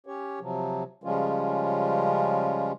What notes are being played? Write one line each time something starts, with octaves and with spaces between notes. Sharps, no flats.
C#4 G4 C#5
C3 F3 F#3
C#3 F3 G3 G#3 C#4 F4